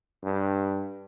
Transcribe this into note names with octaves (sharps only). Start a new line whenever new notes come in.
G2